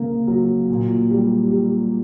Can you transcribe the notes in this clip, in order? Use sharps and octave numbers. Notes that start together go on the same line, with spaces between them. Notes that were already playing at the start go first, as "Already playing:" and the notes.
Already playing: C#3 A#3
F#3
A#2
G3
G3